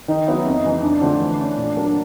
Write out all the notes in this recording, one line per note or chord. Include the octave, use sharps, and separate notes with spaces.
D#3 D#4
F#3 B3 E4
F2
C#3 E3 G#3
F2 D4
D3 F3 A3 C4
E3
A3 C#4
A#2
F#3 A#3